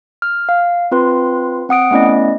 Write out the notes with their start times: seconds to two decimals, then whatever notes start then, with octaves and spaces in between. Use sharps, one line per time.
0.22 F6
0.49 F5
0.92 C4 F4 B4 C6
1.69 C4 F#5 D#6 D7
1.91 A3 B3 C#4 E4 D5 D#5